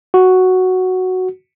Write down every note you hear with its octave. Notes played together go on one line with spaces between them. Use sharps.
F#4